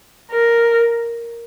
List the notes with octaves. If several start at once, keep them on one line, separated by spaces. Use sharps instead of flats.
A#4